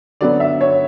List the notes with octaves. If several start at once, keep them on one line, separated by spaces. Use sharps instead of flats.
D3 F#3 B3 D5
E5
C#5